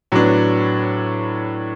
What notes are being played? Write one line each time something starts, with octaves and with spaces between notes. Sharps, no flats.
A2 F#3 B3 D4